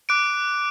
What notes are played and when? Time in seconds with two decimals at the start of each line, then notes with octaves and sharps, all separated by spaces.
0.09 D6 F#6 D7